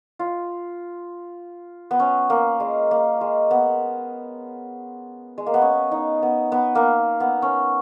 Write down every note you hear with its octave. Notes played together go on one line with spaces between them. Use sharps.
F4
B3
C#4
A#3
G#3
A#3
G#3
B3
G#3
A#3
B3
C#4
D#4
B3
B3
A#3
B3
C#4